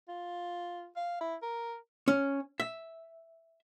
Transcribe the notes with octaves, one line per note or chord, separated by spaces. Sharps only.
F4
F5
E4
A#4
C#4
E5